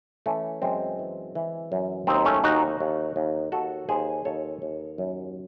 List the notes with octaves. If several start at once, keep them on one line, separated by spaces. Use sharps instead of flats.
E3 A3 C#4
F#2 G#3 C4
E3
E3
F#2
D#2 C4 D#4
A3 C#4
D#2 D#4 F#4
D#2
D#2
D#2 F#4 A4
D#2 G#4 C5
D#2 A4 C#5
D#2
F#2